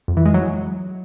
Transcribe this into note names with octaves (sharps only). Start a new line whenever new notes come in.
F2
E3
G#3
F#3